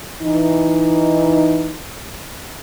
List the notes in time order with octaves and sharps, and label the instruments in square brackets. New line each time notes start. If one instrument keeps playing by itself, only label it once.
[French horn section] E3 D#4